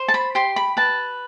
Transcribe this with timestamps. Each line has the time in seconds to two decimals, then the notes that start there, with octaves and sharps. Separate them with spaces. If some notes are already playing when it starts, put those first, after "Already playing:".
Already playing: C5
0.08 A5
0.14 B5
0.35 G4 C6
0.56 B5
0.77 B4 A5